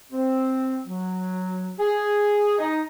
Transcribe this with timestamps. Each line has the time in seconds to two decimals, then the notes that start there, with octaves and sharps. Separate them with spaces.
0.12 C4
0.87 F#3
1.79 G#4
2.59 D#4